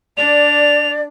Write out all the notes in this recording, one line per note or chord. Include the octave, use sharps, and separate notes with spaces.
D4 D5 F7